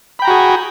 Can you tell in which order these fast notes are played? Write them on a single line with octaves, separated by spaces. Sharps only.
B5 G5 A#5 F#4 G#4